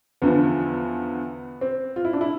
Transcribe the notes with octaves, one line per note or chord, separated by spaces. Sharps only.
E2 D3 F3 B3
C4
F4
E4
D4
E4